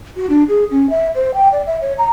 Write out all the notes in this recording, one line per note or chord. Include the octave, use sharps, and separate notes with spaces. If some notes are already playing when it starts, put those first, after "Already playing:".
F#4
D4
G#4
C#4
E5
C5
G5
D5
E5
C#5
A#5